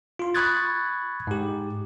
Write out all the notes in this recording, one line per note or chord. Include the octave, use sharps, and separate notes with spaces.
F4 C6
B5 C#6 D#6 F#6 G#6 A6
G#2 G4